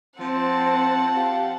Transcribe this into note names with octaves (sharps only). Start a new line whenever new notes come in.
F3 C4 F#5 A5
G4 F5